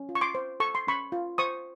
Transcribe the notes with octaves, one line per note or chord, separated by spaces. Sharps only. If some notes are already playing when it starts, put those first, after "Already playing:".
Already playing: C#4
F4
C#6
C6 D6
C5
A4 C#6
C6
C#4 B5 C#6
F4
C5 C#6 D#6